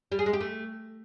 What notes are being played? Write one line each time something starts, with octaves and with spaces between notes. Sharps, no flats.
G3
G#4
G#3
G4
A3